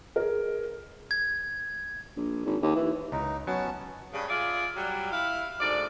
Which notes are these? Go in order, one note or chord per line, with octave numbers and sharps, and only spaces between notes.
G#4 A#4
G#6
A#1
G#1
D#2
E3
C#2 D#4
F#3 B3 C#4 A5
G2 C#3
F4 G#4 D5 E5
F#3 G3
E4 F5
D2 G#2 D5